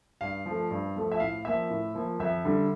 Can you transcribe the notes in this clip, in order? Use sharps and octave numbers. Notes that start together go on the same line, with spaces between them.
G2 F5
F3
A3
G2
F3 A3
E5
A2 F5
F3 A#3 E5
A2
F3 A#3
F2 E5
D3 G3